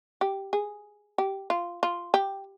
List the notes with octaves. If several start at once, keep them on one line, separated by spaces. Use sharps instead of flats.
G4
G#4
G4
F4
F4
G4